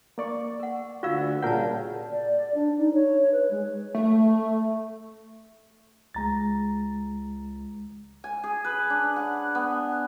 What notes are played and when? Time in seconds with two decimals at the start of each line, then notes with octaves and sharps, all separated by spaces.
0.18 A#3 D5 C#6
0.60 A#4 F#5
1.03 D2 D3 F4 F#4 D5 F5 E6
1.43 A#2 C#3 G3 A#4 F#5 A5 G6
2.10 D5
2.54 D4
2.78 D#4
2.94 C#5
3.32 B4
3.50 G#3
3.95 A3
6.14 C#2 G#3 A#5 A6
8.24 G#5
8.44 G#4
8.64 B4
8.90 D4
9.16 F#5
9.55 B3